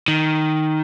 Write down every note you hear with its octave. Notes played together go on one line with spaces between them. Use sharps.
D#3